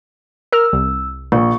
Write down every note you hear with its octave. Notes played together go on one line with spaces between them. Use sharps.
A#4 E6 F6
C2
A#1 C#6